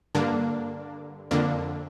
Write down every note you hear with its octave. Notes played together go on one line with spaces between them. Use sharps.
G2 D3 A#3 D4
F2 D3 A#3 D4